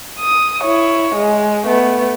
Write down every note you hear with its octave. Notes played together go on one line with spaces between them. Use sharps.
D#6
E4 C#5
G#3
A3 B3